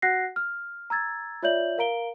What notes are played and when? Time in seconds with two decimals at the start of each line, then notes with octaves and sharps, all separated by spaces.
0.02 F#4 F#5 F#6 A#6 C7
0.36 F6
0.90 A#5 E6 G#6 A6
1.43 F4 C#5 D5 E5 G6 F#7
1.78 A#4 F5 A#5 D7 G7